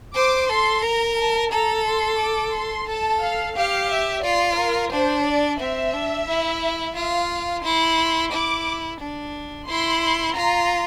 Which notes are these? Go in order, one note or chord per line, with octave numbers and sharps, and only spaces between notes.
C5 D6
A4 C6
A#4 A#5
A5
A4 A#5
C6
D6
C6
A4 A5
F5
G4 F5
E5
F4 D5
A#4
D4 C5
D5
C4 E5
D4
E4
F4 F5
E4 C6
E4 D6
D4
E4 C6
C6
F4 A#5